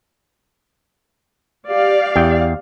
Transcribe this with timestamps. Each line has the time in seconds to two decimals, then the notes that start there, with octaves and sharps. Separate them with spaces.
1.69 G4 D5 F5
2.16 E2 G5